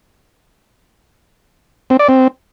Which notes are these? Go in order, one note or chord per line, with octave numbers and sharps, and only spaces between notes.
C4
D5
C4